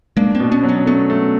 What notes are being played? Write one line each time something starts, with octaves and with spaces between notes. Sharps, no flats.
G#3 A#3 D4
A#3 C4
B2
B3 C#4
F#3
B3 C#4
A3 B3 C#4
A3